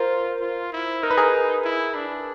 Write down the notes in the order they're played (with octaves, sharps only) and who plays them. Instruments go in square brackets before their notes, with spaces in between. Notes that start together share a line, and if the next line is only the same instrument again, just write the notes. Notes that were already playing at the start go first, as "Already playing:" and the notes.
Already playing: [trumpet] F4 [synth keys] A#4 C5
[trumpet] F4
E4
[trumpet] D#4 [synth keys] A#4
[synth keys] B4
G#4 A#4
[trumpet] E4
D4